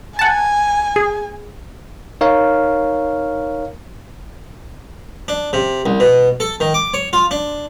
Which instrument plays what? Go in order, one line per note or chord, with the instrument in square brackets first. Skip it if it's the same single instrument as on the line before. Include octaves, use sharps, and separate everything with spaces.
[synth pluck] F#5 A5 [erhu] G#5
[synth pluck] G#4
[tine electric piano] D#4 A#4 C#5 F5
[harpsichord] D4
C3
C2
B2
A4
D#3
D6
C#5
F4
D4